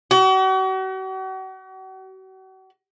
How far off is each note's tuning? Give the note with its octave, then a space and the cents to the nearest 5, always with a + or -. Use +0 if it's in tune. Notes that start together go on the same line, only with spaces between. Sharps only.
F#4 +40